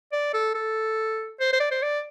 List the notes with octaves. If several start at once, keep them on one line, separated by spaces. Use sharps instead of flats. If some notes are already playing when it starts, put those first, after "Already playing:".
D5
A4
A4
C5
C5
D5
C5
D5